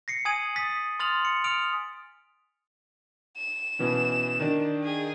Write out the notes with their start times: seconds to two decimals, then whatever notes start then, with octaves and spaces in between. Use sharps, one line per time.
0.08 A#6 C7 C#7
0.25 G#5 D#6 G#6 D#7 F#7
0.56 D#6 A6 B6
1.00 C6 D#6 F6 A6 F7 F#7
1.22 C6 C#7
1.44 D#6 F6 D7 F7
3.37 E7
3.79 B2 E3 C#4
4.40 D#3 D4 D5
4.83 G#4